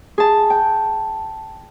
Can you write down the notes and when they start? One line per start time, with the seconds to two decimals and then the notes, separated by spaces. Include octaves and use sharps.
0.18 G#4 A5
0.50 G5